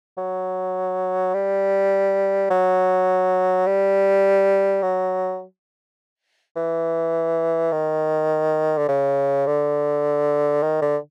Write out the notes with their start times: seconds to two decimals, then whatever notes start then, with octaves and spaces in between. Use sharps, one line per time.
0.18 F#3
1.34 G3
2.50 F#3
3.66 G3
4.82 F#3
6.56 E3
7.72 D#3
8.78 D3
8.88 C#3
9.47 D3
10.63 D#3
10.82 D3